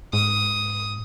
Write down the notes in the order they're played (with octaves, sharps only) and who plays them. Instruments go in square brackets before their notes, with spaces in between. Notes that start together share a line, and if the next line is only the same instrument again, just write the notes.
[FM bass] G#2 [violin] D#6